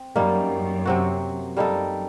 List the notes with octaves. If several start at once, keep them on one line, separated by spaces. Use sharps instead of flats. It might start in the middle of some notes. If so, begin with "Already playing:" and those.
Already playing: C4
F#2 G3 A#3 D#4
C3 F#3 C4 F#4
F#2 G3 A#3 D#4 A4